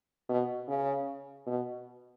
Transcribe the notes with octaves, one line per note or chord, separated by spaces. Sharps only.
B2
C#3
B2